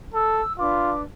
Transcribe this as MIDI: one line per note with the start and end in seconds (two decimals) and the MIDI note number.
0.14 0.42 69
0.14 0.51 88
0.58 1.01 62
0.58 0.94 65
0.58 1.01 71
0.58 1.01 86